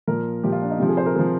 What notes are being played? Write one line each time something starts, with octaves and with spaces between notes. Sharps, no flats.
A#2 F3 A#4
A#2 F3 G4
F4
D4
D#4
C3 F3 G4
G#4
C5
A#4
C3 F3 G#4